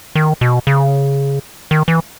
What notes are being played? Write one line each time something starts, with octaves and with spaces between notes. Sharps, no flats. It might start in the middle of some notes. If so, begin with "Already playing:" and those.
D#3
B2
C#3
D#3
E3